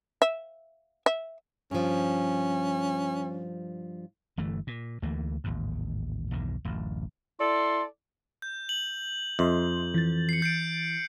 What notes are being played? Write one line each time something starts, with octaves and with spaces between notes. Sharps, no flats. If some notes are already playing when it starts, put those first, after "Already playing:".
E5
E5
G2 F3 C#4
G1 E3 A3
A#2
D2 E3 A3 A#3
A1 D#2 G#2
B1 E2 G2 D#3
D1 A1 F#2
E4 A4 D5 C6
G6
F#7
F2 D#5 E5 C6
E3 A6
C7 C#7
G6 C7 D7